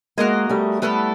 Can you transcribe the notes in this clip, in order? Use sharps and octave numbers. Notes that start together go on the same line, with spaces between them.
G#3 A#3 F#4 A#4 D#5 G#5
G3 A3
G3 A3 B3 E4 A4